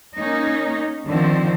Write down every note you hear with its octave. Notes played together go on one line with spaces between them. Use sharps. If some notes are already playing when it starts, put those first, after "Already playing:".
A#3 C#4 D#4
D3 D#3 F3 C4